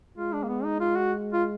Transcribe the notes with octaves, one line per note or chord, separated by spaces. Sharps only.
G#3 F4
D4
A#3
B3
D#4
F4
F#4
F4